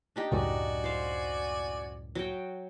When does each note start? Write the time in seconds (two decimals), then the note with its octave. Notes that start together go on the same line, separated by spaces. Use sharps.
0.16 D4 D#4 G4
0.31 C#2 F#2 A2 F#4 D5 G#5
0.84 C5 F5
2.15 F#3 G5